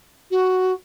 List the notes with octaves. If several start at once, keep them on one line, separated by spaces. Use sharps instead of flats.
F#4